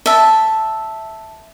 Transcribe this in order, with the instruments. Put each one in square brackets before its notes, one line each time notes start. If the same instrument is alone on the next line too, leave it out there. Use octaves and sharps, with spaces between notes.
[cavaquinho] E5 A5